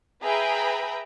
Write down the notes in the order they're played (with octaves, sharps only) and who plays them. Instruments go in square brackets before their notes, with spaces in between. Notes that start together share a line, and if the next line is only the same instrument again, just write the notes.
[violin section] G#4 B4 E5 G5 A#5 B5